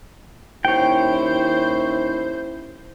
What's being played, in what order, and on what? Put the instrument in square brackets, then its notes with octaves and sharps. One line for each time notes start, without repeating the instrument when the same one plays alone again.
[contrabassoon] D#2 [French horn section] C#4 E4 [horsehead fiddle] C5 [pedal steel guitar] C#5 G5